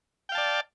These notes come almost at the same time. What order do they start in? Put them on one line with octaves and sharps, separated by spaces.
G5 F5 A5 D5